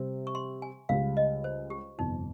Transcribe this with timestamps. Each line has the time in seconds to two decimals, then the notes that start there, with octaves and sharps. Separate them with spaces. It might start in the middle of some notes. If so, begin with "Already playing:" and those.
Already playing: C3 G3 C4
0.27 C#6
0.35 C6
0.62 G#5
0.89 C#2 C#3 G3 F5
1.17 D#5
1.44 C5
1.70 G4
1.98 G1 F2 C3 D#4